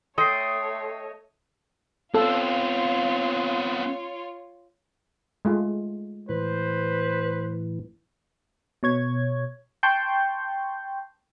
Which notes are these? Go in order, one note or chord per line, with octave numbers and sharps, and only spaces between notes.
A3 A4 C#5 D#5 G5 C6 C7
B3 C4 F4 A4 C#5 F5
G#3 A3 F4
A2 E3 B4 C5
B2 C#5 G#6
G5 A5 C6 C#6 G6